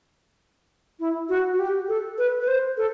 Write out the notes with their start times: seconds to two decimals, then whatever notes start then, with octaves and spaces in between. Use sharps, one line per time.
1.00 E4
1.29 F#4
1.54 F#4
1.59 G4
1.88 A4
2.18 B4
2.41 B4
2.48 C5
2.77 A4